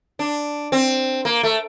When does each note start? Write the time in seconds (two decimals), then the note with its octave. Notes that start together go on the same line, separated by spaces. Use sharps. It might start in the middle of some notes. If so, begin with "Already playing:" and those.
0.19 D4
0.72 C4
1.25 A#3
1.43 A3